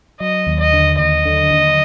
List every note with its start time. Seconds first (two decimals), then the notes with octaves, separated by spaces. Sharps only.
0.20 F#3 D#5
0.47 D#2
0.60 D#5
0.73 D3
0.99 D#2 D#5
1.26 D3
1.51 D#2